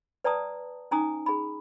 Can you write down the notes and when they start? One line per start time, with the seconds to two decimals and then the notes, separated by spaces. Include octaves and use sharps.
0.24 B4 D5 G5 A5 A#5 D#6
0.91 C#4 D#4 G#5 A#5 D6 D#6
1.26 G#4 B5